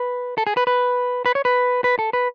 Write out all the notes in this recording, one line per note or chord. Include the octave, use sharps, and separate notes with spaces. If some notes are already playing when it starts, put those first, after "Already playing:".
Already playing: B4
A4
G#4
B4
B4
B4
C#5
B4
B4
A4
B4